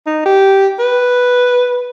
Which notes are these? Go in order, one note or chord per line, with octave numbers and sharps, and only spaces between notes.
D#4
G4
B4